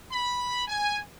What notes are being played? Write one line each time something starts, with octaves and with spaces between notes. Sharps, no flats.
B5
G#5